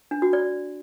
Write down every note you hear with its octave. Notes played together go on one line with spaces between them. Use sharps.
D4
F#4
D5